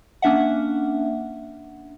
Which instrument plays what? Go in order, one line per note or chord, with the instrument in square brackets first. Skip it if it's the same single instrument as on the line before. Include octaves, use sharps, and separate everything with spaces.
[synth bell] A#3 C#4 D4 E5 F#5